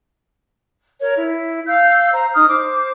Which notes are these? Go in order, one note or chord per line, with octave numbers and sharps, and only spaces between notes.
A#4 C#5
E4
F5 E6 G6
C5 A#5
D#4 D#6 F6
C5 D6